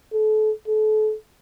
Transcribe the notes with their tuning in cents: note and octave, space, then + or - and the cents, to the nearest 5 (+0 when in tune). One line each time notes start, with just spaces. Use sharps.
A4 -35
A4 -35